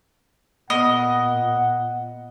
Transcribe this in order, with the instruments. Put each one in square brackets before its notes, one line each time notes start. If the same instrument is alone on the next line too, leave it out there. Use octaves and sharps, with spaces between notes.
[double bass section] A#2 [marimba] B3 [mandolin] D#5 [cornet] F#5